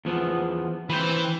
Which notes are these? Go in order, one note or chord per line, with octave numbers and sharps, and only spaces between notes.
E2 F3 B3
E3 B4 C5 G5